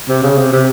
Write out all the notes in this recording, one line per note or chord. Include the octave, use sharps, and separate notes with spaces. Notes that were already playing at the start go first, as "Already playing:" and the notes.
C3
C#3
C3
C3